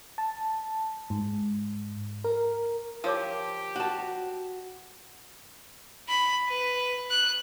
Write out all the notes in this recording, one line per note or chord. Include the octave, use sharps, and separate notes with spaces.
A5
G#2
A#4
F3 G4 A#4 C#5 D6
F#4 A5
B5
B4
F#6